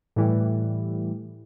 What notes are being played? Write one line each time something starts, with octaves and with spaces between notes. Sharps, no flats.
A2 E3 G3